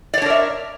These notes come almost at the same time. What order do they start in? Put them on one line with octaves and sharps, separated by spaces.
D5 C#5 D4 A#4 E5